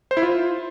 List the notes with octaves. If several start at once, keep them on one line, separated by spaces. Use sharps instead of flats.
C5
E4
F4